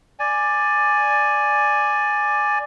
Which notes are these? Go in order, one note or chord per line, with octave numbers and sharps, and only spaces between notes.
D5 G#5